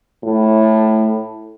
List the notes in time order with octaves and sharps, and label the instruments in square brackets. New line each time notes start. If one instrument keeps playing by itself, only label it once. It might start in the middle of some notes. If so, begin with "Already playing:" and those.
[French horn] A2